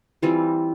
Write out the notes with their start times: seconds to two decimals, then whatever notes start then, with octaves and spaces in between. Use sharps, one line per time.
0.22 E3 G3 C4 F4